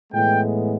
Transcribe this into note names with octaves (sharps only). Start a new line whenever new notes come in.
A2 E3 G#3 B3 G5